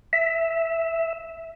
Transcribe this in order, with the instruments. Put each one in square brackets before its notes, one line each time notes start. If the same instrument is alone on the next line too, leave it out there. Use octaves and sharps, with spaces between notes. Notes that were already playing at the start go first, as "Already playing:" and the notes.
[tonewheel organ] E5